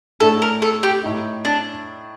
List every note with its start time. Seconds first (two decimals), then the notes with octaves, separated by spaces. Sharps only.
0.20 A2 A3 D4 A4
0.42 A#4
0.62 A4
0.83 G4
1.03 A2 A3 D#4
1.45 D4